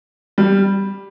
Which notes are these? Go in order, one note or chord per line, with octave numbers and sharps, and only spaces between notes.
G3